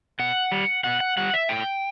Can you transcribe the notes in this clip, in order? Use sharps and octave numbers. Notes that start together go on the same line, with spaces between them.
B2 F#5
G3
B2 F#5
F#5
G3 F#5
E5
A2 G5